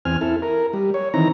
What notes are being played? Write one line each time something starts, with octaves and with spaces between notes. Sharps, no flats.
E2 C4 G#5 F6
E4 A4
A#4
G3
C#5
D#3 E3 C4 A#5